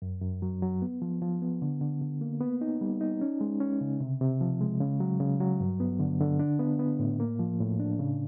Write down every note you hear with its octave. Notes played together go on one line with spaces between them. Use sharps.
F#2
F#2
F#3
F#3
B3
F3
F3
B3
D3
D3
D3
A#3
B3
D#4
G3
D#4
C#4
G#3
C#4
C#3
C3
C3
F3
G#3
C#3
F#3
C#3
F#3
G2
B3
D3
D3
D4
B3
B3
A2
A#3
F3
A2
D4
C#3